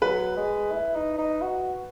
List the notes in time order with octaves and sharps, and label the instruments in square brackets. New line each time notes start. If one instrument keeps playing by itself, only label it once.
[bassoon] F#3 [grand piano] B4
[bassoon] G#3
E4
D#4
D#4
F#4